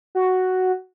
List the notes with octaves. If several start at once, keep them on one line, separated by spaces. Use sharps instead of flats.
F#4